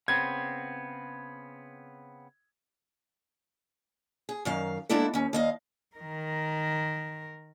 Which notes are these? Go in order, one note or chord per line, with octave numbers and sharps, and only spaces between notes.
C#3 B3 C4 G#6
G#4
F#2 D#3 F5
G#3 A#3 B3 D4 E4 A4
D#2 C#4
D#2 D#5 F5
D#3 A#4